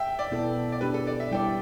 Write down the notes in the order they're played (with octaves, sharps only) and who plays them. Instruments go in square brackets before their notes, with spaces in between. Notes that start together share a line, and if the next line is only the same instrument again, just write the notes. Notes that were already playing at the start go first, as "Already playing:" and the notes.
Already playing: [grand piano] E5 G5
D5
[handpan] B2 B3 E4 A4
[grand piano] D5
[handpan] B3 D4 G4 [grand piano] B4
[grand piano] A4
D5
E5
[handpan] G3 E4 A4 D5 [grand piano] G5